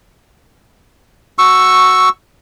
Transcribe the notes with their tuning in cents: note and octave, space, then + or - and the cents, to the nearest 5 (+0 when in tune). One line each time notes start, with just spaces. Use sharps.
F#4 +0 C#6 +0 E6 +0